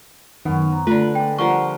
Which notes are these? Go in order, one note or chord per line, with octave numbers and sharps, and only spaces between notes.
F#2 D#3 B3 C#4
C5 A#5
D3 A3 F4 B4
G#3 D5 G5
F3 G3 A#4 F#5 C6 C#6